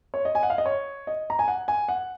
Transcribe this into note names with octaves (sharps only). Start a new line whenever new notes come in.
C#5
D#5
G#5
F#5
F5
D#5
C#5
D#5
A#5
G#5
F#5
G#5
F#5